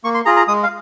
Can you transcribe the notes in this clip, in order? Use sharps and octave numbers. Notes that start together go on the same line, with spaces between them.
A#3 C#6
C6
F4 G#4 A#5
A#5
G#3 D#6
F5